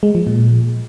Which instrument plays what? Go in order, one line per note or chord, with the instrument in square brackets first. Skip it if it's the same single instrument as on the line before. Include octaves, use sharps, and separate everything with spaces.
[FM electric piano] G#3
F3
A#2